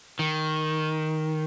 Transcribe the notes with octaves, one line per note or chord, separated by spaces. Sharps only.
D#3